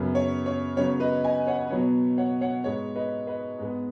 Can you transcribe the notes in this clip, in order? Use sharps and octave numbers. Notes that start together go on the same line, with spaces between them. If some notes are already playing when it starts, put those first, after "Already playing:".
Already playing: F#2 C#3 F#3 B3
C#5
C#5
C#3 F#3 B3 C#5
B4 D#5
D#5 G#5
C#5 F#5
B2 F#3 B3 C#5
C#5 F#5
C#5 F#5
G#2 G#3 B3 C#5
B4 D#5
B4 D#5
G#2 G#3 B3